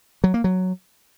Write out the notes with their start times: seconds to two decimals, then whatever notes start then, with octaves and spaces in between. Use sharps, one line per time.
0.24 F#3
0.34 A#3
0.44 F#3